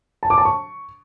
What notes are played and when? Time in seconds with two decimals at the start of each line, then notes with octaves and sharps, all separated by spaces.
0.23 A5
0.30 D6
0.38 A5
0.45 C#6